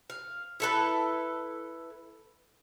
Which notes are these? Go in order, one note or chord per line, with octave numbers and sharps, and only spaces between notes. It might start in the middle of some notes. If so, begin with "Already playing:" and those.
F5
E4 A4 B4